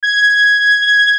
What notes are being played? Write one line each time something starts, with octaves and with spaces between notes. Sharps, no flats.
G#6